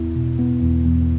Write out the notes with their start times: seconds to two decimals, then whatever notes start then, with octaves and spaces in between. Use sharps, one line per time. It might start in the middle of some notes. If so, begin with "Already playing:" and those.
Already playing: E2 B3 E4
0.15 B2
0.39 B3
0.62 E2
0.85 E2